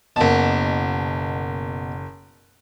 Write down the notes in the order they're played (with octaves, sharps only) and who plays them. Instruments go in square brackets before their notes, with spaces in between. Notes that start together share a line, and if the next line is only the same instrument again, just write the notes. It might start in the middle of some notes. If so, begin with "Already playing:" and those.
[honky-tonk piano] F#1 A5 [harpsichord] B2 A#3